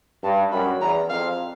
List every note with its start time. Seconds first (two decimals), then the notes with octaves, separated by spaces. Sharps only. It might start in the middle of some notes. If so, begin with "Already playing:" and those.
0.24 G2 A5
0.52 F#2 B5
0.81 E2 A#5
1.10 F2 F5